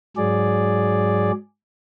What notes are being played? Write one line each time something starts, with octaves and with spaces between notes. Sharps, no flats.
G#2 F#3 G#4 D5